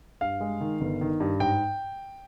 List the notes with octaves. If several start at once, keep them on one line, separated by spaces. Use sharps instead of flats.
G2 F5
G#3
D#3
G1
D#3
G2
G#2 G5